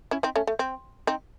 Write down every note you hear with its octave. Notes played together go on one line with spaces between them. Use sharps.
C#4 E4
C4 D#4
A3 C#4
A3
C4
C4 D#4